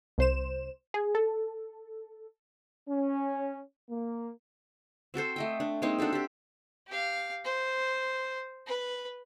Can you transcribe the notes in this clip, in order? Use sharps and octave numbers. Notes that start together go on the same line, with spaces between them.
C2 C5 E7
G#4
A4
C#4
A#3
C4 F#4 A4 C5
A3 D#5 G5
D4
G#3 A#3 C4 D#4
D4 F#4 A4 C5
G4 D5
G4 F5
C5
B4